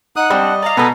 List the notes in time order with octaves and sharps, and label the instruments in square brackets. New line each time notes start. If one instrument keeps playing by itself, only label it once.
[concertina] D#4 D#6 F#6 [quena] F#5
[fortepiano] G3 [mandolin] C4 D4 [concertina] D#5
[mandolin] D5 F5 [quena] A#5
[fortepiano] B2 [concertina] A4 F#5 G#5 [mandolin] B4 D#5